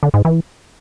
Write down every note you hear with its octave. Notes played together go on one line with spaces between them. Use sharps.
D3
G#2
E3